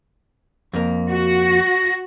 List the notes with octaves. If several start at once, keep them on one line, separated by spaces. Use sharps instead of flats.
F2 A#3
F#4
A#6